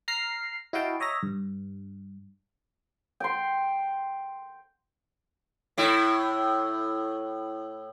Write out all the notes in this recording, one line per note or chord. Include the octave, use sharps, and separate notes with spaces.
A#5 F6 C7
E4 F#4 D#5 F5 G5 A5
C#5 D#5 E5 A#5 A#6
G2
G5 C6
A2 E4